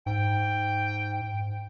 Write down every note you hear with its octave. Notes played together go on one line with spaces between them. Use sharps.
G#2 G5